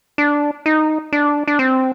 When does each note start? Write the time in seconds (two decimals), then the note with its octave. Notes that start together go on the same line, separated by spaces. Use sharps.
0.18 D4
0.66 D#4
1.13 D4
1.47 D4
1.59 C4